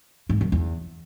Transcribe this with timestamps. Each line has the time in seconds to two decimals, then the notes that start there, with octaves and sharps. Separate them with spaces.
0.29 G#2
0.41 F#2
0.52 E2